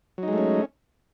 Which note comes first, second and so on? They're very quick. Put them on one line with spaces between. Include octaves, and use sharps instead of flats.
F#3 D#4 G#3 A3 C#4